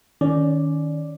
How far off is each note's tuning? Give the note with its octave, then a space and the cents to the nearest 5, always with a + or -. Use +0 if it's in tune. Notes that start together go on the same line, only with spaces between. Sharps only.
D#3 +0 C#4 +20 D5 +0